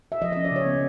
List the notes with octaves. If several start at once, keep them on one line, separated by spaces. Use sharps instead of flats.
E5
F3 D#5
C#4 D#5
D5
C#3 C#5
B3